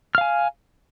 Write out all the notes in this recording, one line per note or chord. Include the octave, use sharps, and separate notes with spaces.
F5 G#5 F6